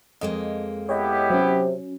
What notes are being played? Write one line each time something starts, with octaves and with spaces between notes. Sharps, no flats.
F2 G#3 A#3 D#5
B3 E4 G4 C#5 D#5
C3 F#3 C#4